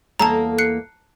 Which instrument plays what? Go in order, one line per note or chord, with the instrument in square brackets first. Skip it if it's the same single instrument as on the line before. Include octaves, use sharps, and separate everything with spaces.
[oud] E2 A#3 A4 [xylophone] A5 A#5
[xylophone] F#6 C7 C#7